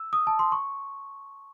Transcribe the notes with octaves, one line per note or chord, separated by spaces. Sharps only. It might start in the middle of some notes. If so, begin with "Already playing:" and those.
Already playing: E6
D#6
A5
C6
C#6